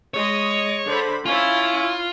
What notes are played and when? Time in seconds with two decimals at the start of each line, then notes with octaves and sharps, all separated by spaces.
0.14 G#3 C#5 D#5
0.88 D3 C5 B5
1.26 C#4 E4 F4